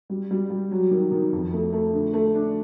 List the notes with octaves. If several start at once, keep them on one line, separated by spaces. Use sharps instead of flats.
G3
G3
G3
F#3
D#3
D#3
F2
A3
A3
D3
A3
D4